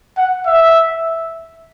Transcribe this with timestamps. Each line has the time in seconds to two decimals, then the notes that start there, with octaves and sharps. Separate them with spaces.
0.17 F#5
0.46 E5